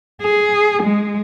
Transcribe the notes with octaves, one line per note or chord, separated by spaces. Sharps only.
G#4
G#3